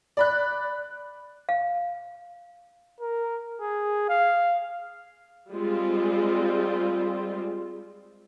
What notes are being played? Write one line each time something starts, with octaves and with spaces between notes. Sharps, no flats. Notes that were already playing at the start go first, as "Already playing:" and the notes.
D5 B5 F#6
F5
A#4
G#4
F5
G3 G#3 C4 F4